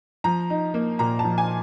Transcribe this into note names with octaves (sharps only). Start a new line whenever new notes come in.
F3 A#5
D#4
A#3
A#2 A#5
A5
F3
G#5